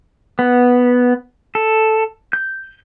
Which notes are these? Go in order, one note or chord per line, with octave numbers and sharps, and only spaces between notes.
B3
A4
G6